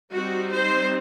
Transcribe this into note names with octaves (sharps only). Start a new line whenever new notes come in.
G3 C4 D#4 F#4
C5